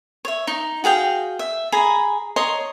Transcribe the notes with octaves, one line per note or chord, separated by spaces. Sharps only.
C#5 E5
D#4
F#4 G#4 F5 G5
E5
G#4 G#5 A#5 B5
C#5 D#5 A#5 C6